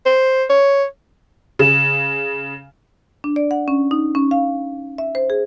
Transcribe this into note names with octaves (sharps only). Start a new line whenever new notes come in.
C5
C#5
C#3
D4
D5
F#5
C#4
D#4
C#4
F5
E5
C5
G#4